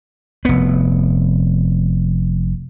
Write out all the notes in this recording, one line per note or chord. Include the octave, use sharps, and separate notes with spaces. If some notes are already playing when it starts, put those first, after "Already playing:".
F1 B3